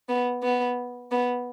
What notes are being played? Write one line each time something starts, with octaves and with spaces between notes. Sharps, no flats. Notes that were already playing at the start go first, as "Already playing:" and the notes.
B3
B3
B3